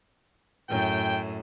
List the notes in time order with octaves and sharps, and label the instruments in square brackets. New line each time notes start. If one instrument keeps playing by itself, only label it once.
[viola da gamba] F#2 A2 [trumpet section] G5